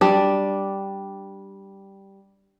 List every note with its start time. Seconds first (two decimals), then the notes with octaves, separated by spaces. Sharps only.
0.01 G3 D4